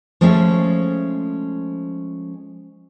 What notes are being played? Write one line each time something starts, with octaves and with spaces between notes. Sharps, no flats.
F3 G#3 A3 C#4 E5 F5